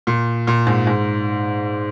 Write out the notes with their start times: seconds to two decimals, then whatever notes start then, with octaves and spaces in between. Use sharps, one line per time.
0.07 A#2
0.47 A#2
0.67 G#2
0.87 G#2